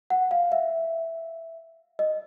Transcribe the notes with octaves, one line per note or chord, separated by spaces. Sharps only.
F#5
F5
E5
D#5